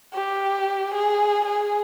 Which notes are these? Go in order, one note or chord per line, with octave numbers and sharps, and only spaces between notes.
G4
G#4
G#4